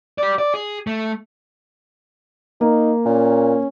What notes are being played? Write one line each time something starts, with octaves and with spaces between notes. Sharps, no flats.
G4 D5
D5
G#4
A3
A#3 D#4
A#2 C#4